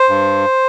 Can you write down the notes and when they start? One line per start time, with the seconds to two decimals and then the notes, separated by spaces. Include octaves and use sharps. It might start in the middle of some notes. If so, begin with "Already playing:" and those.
Already playing: C5
0.09 G2